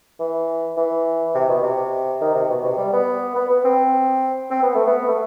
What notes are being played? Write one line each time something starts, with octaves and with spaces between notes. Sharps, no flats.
E3
E3
C3
B2
C3
D#3
C3
B2
C3
G3
B3
B3
B3
C4
C4
B3
A3
B3
A3